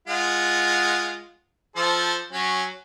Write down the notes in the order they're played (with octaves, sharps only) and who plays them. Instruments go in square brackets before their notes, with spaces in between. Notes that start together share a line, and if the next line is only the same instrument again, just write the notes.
[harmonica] G#3 F4 F#5
F3 A4 C5
F#3 C#4